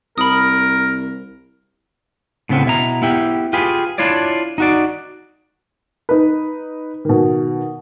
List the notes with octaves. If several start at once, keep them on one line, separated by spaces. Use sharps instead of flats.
C2 A#4 B5 D#6
A2 C#3 B3 C4
B2 E4 A#5
B3 E4 G4
F4 G4 G#4 B4
D4 E4 F4 C#5 D5
D#4 F#4 D5
D#4 B4
B2 D#3